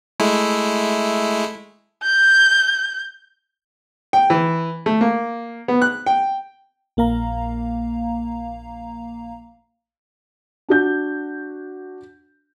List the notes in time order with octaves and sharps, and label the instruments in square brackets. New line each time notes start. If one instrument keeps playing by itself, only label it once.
[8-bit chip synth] G#3 A3 E4
[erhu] G6
[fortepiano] G5
E3
A3
A#3
B3
F#6
G5
[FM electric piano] A#1 A#3 F5 A#5
[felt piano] D4 F#4 G6